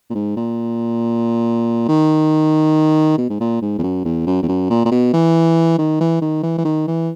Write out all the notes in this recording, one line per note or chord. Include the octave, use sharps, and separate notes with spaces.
A#2
G#2
A#2
D#3
B2
G#2
A#2
G#2
E2
F#2
E2
F#2
E2
F#2
A#2
A#2
B2
E3
D#3
E3
D#3
E3
E3
D#3
E3